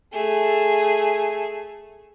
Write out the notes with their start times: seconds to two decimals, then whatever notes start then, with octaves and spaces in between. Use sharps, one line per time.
0.13 A3 G#4